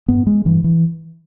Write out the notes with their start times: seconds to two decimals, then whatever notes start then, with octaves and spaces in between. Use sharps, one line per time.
0.08 G2 B3
0.27 G#3
0.45 G2 E3
0.64 E3